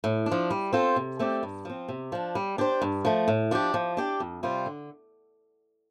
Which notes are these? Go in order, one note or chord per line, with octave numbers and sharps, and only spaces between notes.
A2
D4
F3
G3
C4 F4 A4 C5
C3
A3 C4 G4 D5
G2
F3 C4
C3
F3 D4
G3
D4 G4 C5
G2
F3 A3
A2
F3 D4 G4
F3
D4 G4 D5
F2
C3 G3 F4 C5
D3